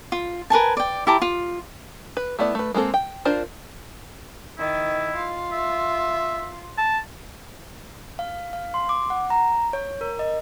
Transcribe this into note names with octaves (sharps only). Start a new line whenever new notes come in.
F4
A#4 B4 G#5 A5
D5 G5
E4 G4 A5 A#5
F4
B4
A3 B3 E4 D5
A3 B4
G#3 A#3 C4 A4
G5
D4 F4 A#4 C5
D#3 E4
F4
E5
A5
F5
F5
C6
D6
F#5
A#5
C#5
A#4
D#5